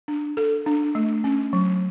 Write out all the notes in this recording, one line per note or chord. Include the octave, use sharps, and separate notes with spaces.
D4
A4
D4
A3
C#4
F#3